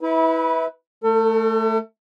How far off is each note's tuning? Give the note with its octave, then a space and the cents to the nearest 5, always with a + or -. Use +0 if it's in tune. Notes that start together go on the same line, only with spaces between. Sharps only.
E4 -25 B4 +5
A3 +0 A4 +40